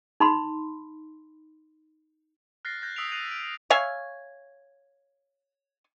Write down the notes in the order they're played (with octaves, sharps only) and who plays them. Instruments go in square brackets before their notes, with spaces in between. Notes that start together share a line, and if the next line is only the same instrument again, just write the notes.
[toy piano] D#4 B5 C6
[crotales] F6 F#6 A6 A#6 C7
F#6 G6 A6 A#6
D#6 E6 B6 D7 F7
F#6 G6 C7 D#7 F7
D7
[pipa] C#5 E5 F5 G#5